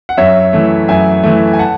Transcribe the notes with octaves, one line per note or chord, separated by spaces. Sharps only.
F#5
F#2 C#5 E5
E3 A3
F#2 E5 G#5
E3 A3
G#5
F#5 A5